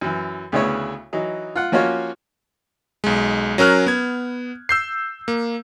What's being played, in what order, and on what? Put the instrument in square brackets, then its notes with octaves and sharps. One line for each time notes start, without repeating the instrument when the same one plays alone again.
[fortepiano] F#2 E3
D2 C#3 B3 C#4 E4 C#5
E3 F#3 D#4
F4 F#5
F3 A#3 C#4 F4 F#4 C#5
[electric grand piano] B1 G#3
F#3 C#4 A#4 F6 F#6
B3 G#6
E6 G6 C7
A#3